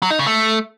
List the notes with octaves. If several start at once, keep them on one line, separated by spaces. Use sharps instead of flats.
F#3
D#4
C#3
A3